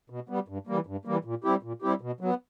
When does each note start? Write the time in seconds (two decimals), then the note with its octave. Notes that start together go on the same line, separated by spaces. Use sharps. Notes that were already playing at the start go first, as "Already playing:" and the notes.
0.10 B2
0.29 G3 B3
0.48 G2
0.67 E3 G3 A#3
0.87 G2
1.05 E3 G3 A#3
1.25 A#2
1.44 G3 C4 E4 G4
1.63 A#2
1.82 G3 C4 E4 G4
2.01 B2
2.21 F#3 B3